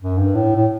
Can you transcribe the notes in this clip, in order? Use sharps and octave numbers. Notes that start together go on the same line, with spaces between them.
F#2
G2
A2
A2